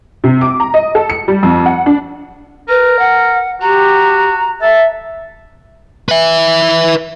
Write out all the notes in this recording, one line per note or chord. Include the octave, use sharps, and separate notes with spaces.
C3
D6
A#5
D#5
A4
C#7
G3
F2
F#5
D4
A#4 B4
F#5
F#4 G4 A#5
A4 E5
B4 E5